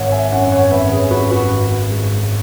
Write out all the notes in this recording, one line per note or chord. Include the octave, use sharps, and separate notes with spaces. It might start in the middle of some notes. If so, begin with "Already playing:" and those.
Already playing: G#1 C#5 F#5
E5 G#5
F#2 C#5 F#5
C#5 F#5
G#1 B4 E5
G#4 C#5
F#2 F#4 B4
F#4 B4
G#1
G#2